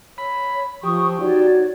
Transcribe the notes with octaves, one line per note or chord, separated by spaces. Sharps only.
C#5 B5
F3 G4 C#6 D#6
D#4 F#4 C#5 D5